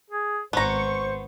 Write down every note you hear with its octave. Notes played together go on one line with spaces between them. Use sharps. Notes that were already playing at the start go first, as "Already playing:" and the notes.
G#4
G#1 B3 C5 A#5 C#6